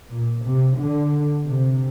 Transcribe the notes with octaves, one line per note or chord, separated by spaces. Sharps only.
A#2
C3
D3
C3